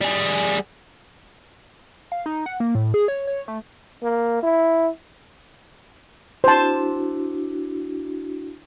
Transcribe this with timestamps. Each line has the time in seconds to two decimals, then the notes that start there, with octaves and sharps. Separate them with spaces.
0.01 G3 G#4
2.12 F5
2.26 D#4
2.46 F#5
2.60 A#3
2.75 A2
2.94 G#4
3.08 C#5
3.27 C#5
3.48 A3
4.03 A#3
4.43 E4
6.44 D4 E4 F#4 C5 A5